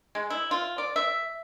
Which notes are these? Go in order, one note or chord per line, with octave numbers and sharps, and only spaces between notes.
G#3
E4
F4
D5
E5